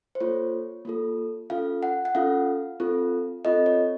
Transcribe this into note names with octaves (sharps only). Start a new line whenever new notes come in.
C5
A#3 F4 A4 C#5
A#3 F4 A4
C#4 F4 A4 F5
F#5
F#5
C#4 F4 A4 F5
C4 F4 A4
C4 F4 A4 D#5
C#5